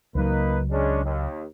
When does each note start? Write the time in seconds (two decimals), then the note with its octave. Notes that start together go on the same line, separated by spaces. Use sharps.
0.15 C#2 F#3 A#3 D#4 B4
0.70 G#3 C#4 D4
1.04 D#2